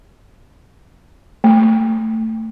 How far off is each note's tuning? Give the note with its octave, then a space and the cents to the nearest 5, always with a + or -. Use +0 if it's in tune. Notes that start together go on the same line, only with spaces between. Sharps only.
A3 +15